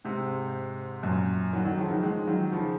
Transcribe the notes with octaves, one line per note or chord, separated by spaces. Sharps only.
G#2 C3
F#2 A#2
D#3 F#3
D#3 F#3
C#3 F3
D#3 F#3
F3 G#3
D#3 F#3
C#3 F3